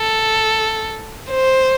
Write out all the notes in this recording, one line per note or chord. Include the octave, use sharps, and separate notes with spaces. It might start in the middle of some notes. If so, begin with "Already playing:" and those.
Already playing: A4
C5